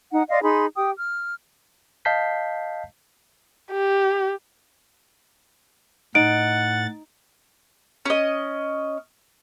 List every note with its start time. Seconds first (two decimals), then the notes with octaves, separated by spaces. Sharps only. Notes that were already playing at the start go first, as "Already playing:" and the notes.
0.11 D#4 F#5
0.30 D5 D#5 F5 C6
0.43 D#4 G#4 B5 C6
0.76 G4 G5 D#6
0.97 F6
2.05 D#5 F5 A5 G6 B6 C7
3.71 G4
6.15 A2 D#4 F#5 A6 D7
8.06 C#4 D#5